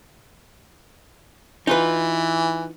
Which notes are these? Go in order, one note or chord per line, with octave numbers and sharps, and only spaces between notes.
E3 D#4 F4 B4